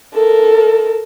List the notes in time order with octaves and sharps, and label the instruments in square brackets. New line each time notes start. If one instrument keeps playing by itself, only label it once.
[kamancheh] A4 A#4